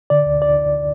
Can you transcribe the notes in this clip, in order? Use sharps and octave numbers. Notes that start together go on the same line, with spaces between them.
D3 D5
D2
D5